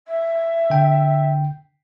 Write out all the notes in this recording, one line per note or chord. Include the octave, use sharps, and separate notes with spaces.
E5
D3 G5